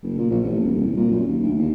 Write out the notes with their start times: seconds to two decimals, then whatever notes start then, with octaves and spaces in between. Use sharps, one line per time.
0.03 F#1
0.18 A#2
0.30 A#1
0.44 A1
0.63 D#1
0.81 C2
0.97 A#2
1.11 F#2
1.27 D#2
1.43 D2
1.59 D#2